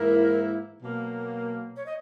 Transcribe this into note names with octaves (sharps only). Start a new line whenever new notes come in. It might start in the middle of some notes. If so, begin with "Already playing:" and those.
Already playing: G#2 E3 A#3 E4 A#4
B2 F#3 A#3
C#5
D#5